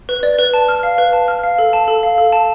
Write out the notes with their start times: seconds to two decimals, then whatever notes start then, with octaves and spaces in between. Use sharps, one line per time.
0.09 B4
0.23 D5
0.39 B4
0.54 A5
0.69 F6
0.83 F5
0.98 B4
1.13 A5
1.28 F6
1.43 F5
1.58 A4
1.73 A5
1.88 A4
2.03 F5
2.18 A4
2.33 A5